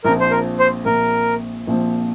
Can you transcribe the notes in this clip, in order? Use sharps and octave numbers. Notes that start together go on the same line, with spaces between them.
A#1 A#2 F3 C4 A#4
C5
A#4
C5
A#1 A#2 F3 C4 A#4
A#1 A#2 F3 C4